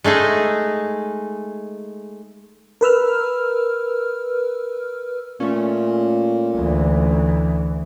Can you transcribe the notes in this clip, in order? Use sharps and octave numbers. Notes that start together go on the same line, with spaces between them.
G#3 A3 D#4 G#4
A#4 B4 E6 F6
A#2 A3 C#4
D2 E3